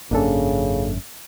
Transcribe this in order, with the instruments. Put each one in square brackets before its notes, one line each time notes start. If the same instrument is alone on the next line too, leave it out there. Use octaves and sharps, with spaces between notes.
[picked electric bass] G#1 F#2 C#4 [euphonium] C#3 [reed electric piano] A#3 D4 A4